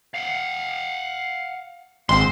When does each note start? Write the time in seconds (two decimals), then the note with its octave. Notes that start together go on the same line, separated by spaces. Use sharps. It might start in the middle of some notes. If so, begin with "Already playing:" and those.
0.14 F5 F#5
2.09 G#1 G#3 C4 C5 C6